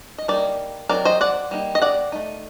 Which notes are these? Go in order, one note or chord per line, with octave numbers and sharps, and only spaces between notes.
D#5
G3 A#3 D#4 A#4 D5
F#3 C4 D#4 A#4 D5
C5 D#5
D5 F#5
G3 A#3 D#4
D#5
D5 F#5
A3 D#4